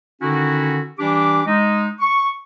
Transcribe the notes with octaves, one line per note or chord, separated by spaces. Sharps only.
D3 D#3 C#4 D#4 E4 F#4
E3 G3 D4 G4 D6
G#3 D#4
C#6